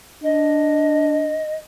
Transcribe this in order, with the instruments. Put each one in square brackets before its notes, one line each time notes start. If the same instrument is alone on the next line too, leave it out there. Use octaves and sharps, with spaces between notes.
[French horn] D4 [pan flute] D#5